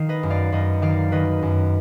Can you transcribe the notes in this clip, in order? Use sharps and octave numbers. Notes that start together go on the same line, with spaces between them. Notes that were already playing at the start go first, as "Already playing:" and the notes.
Already playing: D#3 F5
B4 D#5
F#2
D5 F5
F#2 B4 D#5
D#3 D5 F5
D#3 B4 D#5
F#2